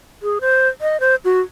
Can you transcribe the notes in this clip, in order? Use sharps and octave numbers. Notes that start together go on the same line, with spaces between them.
G#4
C5
D#5
C5
F#4